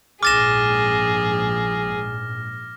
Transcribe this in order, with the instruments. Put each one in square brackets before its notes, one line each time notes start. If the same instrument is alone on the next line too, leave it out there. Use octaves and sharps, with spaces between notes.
[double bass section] A#1 G#2 [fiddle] G#4 [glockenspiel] D6 A6 E7 [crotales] F6 A#6